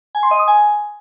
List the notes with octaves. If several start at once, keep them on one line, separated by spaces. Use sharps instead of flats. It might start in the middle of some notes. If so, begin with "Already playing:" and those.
G#5
C6
D#5
D#6
G#5